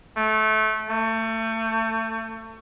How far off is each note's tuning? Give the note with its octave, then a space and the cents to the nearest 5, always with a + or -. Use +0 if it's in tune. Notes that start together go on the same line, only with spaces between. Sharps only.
A3 -20
A3 +30